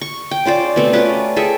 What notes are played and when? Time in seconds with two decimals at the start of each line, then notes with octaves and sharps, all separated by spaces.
0.01 C#6
0.31 G5
0.45 C#4 F4 C5 D5
0.76 B2 A3 C4
0.93 C#4 F4 B4 D5
1.36 G#4 A4 E5 G5